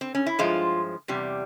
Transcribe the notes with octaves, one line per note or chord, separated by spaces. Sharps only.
C4
C#4
E4
G2 F3 G#3 F4
E2 C3 G3